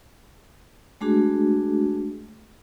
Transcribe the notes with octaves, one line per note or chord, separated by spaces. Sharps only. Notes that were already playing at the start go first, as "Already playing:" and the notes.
G#3 A3 D4 F#4 G#4